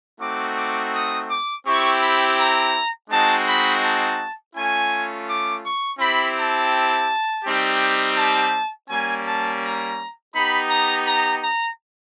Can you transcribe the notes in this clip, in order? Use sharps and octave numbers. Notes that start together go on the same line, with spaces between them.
A3 C4 D#4 F#4 D6
D6
D#6
D6
C4 E4 G4 C#6
B5
A#5
G#3 C4 D#4 F#4 A5
B5
A5
A3 C#4 F4 G#5
D6
C#6
C4 E4 G4 B5
A5
G3 C4 D#4 G4
A5
G3 A#3 C#4 G#5
A5
A#5
B3 D#4 G4 B5
A#5
A#5
A#5